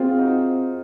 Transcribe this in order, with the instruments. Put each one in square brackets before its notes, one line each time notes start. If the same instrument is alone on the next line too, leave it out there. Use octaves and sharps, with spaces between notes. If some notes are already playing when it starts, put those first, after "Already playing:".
Already playing: [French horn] C4 [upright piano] F4 F#4 G#4 A#4
[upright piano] F4
D#4 F#4